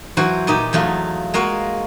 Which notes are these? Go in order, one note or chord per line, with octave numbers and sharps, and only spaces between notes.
E3 F#3 F#4 C5
A#2 D#4 G4
E2 F#3 A3 F4
G#3 A#3 F4 F#4